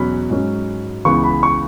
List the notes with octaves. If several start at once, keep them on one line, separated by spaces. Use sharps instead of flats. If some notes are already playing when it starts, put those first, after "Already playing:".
Already playing: E2 B2 F#3 C#4 B5
G#2 F#3 C#4
C#2 C#3 E3 B3 C#6
B5
C#6